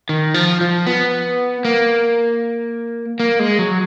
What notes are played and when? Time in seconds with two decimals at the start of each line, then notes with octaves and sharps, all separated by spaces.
0.09 D#3
0.34 F3
0.61 F3
0.87 B3
1.65 A#3
3.20 A#3
3.39 G#3
3.59 F#3